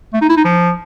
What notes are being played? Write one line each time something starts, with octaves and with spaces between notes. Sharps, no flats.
A3
D#4
E4
D#4
F3